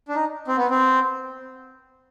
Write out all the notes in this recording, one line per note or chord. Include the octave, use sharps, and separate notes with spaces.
D4
D#4
C4
B3
C4